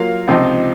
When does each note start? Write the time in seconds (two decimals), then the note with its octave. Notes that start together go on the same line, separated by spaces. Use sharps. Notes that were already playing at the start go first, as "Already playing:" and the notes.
Already playing: F#3 A#3 F4 A#4 F5
0.28 C#2 C3 F3 C4 D#4